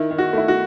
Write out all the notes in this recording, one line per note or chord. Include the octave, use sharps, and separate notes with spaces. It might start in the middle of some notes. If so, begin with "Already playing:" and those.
Already playing: D#3 E4
D#3
F#4
A3 E4
F#4